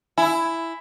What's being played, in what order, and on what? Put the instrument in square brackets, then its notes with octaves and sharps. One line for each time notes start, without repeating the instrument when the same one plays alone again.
[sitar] E4 [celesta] G#5 E6